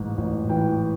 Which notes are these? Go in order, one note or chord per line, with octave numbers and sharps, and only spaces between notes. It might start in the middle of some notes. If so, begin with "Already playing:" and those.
Already playing: A1 G#2
A1
E3 G5